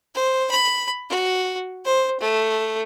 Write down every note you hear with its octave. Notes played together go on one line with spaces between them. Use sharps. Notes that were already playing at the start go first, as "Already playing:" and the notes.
C5
B5
F#4
C5
A3